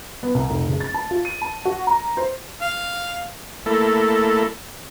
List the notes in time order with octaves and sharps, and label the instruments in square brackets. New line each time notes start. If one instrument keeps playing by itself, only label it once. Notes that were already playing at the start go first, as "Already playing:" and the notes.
[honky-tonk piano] B3
C2
F1
F#1
A6
A5
F4
D#7
A5
F#4
A#5
C5
[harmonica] F5
[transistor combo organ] A3 A#3 E4 A4